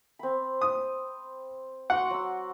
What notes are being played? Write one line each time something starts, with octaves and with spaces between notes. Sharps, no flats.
C4 B5
D#6
F#4 F#5 C6 D6
F#3 E6